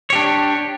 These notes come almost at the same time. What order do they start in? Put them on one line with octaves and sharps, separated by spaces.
C#5 G4 D4